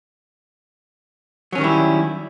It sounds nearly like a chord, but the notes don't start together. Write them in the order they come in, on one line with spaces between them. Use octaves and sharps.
F#3 C#4 D#3 G3 E4